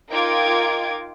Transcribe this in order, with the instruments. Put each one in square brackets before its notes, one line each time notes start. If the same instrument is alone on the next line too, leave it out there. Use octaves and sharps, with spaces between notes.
[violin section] D#4 F4 A#4 G5 D6 G#6